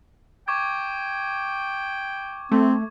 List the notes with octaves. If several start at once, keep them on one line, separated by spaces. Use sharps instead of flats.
G5 C#6 D6 G#6
A3 C4